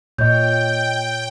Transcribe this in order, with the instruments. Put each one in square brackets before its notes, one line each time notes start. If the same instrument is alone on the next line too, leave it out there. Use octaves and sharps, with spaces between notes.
[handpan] A#2 [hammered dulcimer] C#5 [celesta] D#5 G6 [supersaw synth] G5